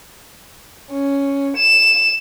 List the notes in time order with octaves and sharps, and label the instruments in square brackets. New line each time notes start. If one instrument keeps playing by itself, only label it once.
[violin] C#4
E7